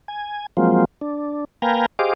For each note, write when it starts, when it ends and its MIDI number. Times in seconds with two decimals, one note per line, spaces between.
0.08 0.46 80
0.57 0.85 53
0.57 0.85 54
0.57 0.85 56
0.57 0.85 58
0.57 0.85 60
0.57 0.85 65
1.01 1.45 62
1.62 1.86 58
1.62 1.86 71
1.62 1.86 77
1.62 1.86 79
1.62 1.86 80
1.62 1.86 82
1.99 2.13 67
1.99 2.13 68
1.99 2.13 72
1.99 2.13 75
1.99 2.13 77
1.99 2.13 86